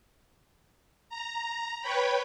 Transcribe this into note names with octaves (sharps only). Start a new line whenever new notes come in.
A#5
B4 C#5 G5 B5